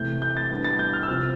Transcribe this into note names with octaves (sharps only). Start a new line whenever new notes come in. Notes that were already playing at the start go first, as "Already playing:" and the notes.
Already playing: C3 E3 A3 G6
G6
A6
A2 G3 B3 D4
A6
G6
F6
E6
C3 F3 C4 F6